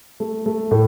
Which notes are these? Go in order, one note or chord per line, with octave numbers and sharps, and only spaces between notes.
A3
A3
A2